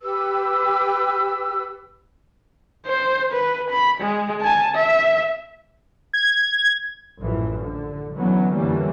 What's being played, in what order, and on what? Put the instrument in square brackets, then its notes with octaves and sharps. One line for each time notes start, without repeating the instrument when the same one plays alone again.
[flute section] G4 B4 E6
[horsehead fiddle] C5
B4
B5
G#3
G#5 A5
E5
[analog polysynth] G#6
[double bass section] A1 F#2 E3 F3
D3
D3 E3 F#3 B3 C#4
F2 D3 E3 G3 A#3 C#4